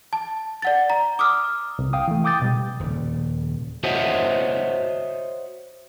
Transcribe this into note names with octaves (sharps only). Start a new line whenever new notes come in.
A5
D5 F#5 A6
A#5
D6 D#6 F6
C2
F5 G5 D#6
E3 A3
G5 D6 D#6 G6 A6
B2 G3
D#1 C#3
F#4 C5 C#5 D#5 E5 F#5